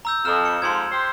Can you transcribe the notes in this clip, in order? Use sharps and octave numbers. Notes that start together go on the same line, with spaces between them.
A#5 E6 G6
F2 F6 E7
C#7
F2 G#2 F3 C6 G#6
G4 C5